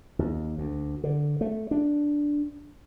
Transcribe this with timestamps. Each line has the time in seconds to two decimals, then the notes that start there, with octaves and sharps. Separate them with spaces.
0.19 D#2
0.58 D2
1.04 D3
1.41 A3
1.71 D4